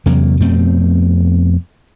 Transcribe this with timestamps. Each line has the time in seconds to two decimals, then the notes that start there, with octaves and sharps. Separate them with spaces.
0.06 E2 C3 F#3 A#3
0.41 F2 B2 A3 C4